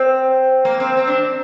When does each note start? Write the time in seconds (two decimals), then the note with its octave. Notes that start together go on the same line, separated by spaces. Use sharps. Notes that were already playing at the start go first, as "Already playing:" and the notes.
Already playing: C4
0.65 A#3
0.80 C4
0.97 C4
1.07 D4